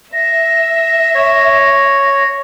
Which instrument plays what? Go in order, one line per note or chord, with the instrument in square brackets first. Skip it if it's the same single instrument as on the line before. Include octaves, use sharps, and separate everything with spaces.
[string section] E5 [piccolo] A#6
[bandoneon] C#5